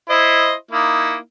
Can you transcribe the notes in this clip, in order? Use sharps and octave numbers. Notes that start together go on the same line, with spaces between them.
E4 C5 D#5
A#3 D#4 E4